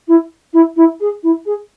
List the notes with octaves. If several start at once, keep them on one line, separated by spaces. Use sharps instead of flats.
E4
E4
E4
G#4
E4
G#4